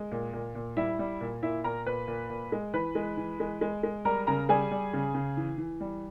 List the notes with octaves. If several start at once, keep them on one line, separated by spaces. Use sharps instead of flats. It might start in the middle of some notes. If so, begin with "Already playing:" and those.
Already playing: G#3
A#2
A#2
A#2
G3 E4 E5
G3
A#2
A#2 E4 E5
A#2 A#4 A#5
A#2 B4 B5
A#2
A#2
G#3
E3 B4 B5
G#3
E3
G#3
G#3
G#3
G3 A#4 A#5
C#3 A#4 A#5
G3 G#4 G#5
G3
C#3
C#3
E3
E3
G3